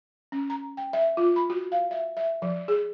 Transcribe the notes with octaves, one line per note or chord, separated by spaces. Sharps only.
C#4
A#5
G5
E5
F4
B5
F#4
F5
E5
E5
F3
G#4